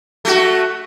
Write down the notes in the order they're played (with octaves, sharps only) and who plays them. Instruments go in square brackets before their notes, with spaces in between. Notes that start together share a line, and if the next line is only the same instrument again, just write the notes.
[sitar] A3 F#4